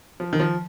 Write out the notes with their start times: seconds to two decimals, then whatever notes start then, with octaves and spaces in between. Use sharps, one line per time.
0.20 F3
0.33 D#3
0.40 F3